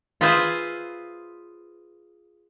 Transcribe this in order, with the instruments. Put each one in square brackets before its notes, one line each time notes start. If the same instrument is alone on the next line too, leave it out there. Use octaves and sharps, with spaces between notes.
[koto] F4 G#4 B4 C5 E5 F5